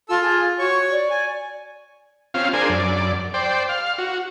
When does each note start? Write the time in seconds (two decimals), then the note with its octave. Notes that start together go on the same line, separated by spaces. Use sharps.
0.09 F4 A4 E6
0.22 G#4
0.59 F#4 C#5 C#6
0.91 D5
1.10 G#5
2.34 C4 C#4 F4 F5
2.53 D4 G#4 A#4 C5 G#5
2.69 F#2 D5
3.34 C5 D5 G5
3.69 F5
3.98 F#4